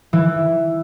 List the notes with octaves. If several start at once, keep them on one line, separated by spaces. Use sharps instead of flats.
E3